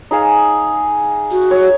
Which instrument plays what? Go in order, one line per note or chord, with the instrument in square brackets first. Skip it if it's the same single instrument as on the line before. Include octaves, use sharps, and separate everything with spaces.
[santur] D#4 G#4 F5
[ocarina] F#4
[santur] C#5